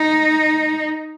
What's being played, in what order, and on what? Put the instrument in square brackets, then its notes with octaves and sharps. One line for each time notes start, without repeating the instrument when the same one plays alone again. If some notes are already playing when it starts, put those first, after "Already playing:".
Already playing: [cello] D#4